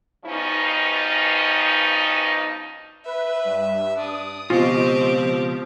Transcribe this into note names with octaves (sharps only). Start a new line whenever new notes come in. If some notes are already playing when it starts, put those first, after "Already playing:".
G2 B2 F3 C#4 D#4
B4 E5
G2
D4 D#6
C#2 B2 F3 C4 F4 G4 D#5
F3